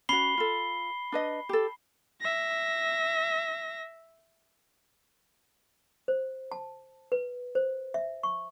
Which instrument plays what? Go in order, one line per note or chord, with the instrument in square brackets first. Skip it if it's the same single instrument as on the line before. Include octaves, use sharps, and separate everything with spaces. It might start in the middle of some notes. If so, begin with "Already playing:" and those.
[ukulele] C#4 F#4 [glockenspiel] B5 C7 G7
[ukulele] F4 A4
D4 B4 D#5
G4 A4
[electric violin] E5 A#6
[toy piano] C5
A5
B4
C5
E5
C#6